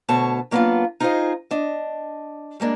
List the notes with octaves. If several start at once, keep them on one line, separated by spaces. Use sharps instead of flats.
D2 B2 A4 C#5 A5
F#3 A#3 B3 C#4 D4 F4
D#4 F4 G#4 A#4 C5 D#5
D4 D#5
G3 G#3 A#3 D4